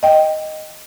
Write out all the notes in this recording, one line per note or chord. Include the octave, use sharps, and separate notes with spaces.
D#5 G5